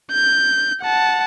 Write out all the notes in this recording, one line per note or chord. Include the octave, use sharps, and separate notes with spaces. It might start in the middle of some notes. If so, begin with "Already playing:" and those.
G6
F#5 A5